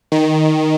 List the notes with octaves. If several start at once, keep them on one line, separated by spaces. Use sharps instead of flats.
D#3